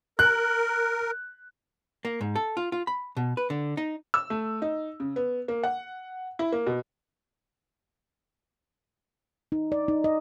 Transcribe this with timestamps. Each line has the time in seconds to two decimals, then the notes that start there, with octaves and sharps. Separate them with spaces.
0.19 A#4 F#6
2.05 A#3
2.21 G#2
2.36 A4
2.57 F4
2.72 F4
2.87 B5
3.17 B2
3.37 B4
3.50 D3
3.77 D#4
4.14 E6
4.30 A3
4.62 D#4
5.00 C#3
5.16 B3
5.48 A#3
5.63 F#5
6.39 E4
6.52 A#3
6.66 B2
9.52 D#4
9.72 D5
9.88 D#4
10.04 D#5